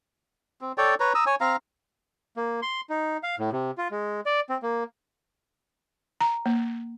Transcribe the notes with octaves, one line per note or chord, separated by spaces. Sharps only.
C4
A4 C#5 D5 G5
B4 C#5 A#5
A#5 D#6 E6
C#5 G#5
C4 F5 A#5
A#3
C6
D#4
F5
A2
C3
F4
G#3
D5
C4
A#3
A#5
A#3